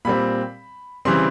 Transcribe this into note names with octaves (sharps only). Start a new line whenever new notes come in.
A#2 G3 C4 B5
C#3 E3 G3 C4 C6